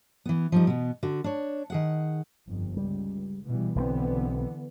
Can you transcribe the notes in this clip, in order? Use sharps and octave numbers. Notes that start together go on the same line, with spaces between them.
E3 B3
F3 G3 D#4
B2 B3
D3 F#4
D4 C#5
D#3 G#4 F#5
G1 F2
C#2 G3
B2 E3 G3
B1 D3 E3 G3 B3 C4